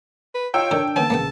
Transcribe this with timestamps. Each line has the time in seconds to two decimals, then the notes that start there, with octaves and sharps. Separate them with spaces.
0.35 B4
0.54 F4 C#5 D#5 F5 G5 E6
0.71 D3 D#3 D4 A#4
0.96 D3 D#3 A#3 B3 C#4 A5
1.10 A#1 C#3 A#3 B3 G5